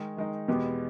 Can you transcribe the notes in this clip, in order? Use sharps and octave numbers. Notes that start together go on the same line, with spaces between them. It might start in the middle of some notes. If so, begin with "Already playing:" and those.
Already playing: D#3 G#3 D#4
D#3 G#3 D#4
E2 B2 G#3 B3 G4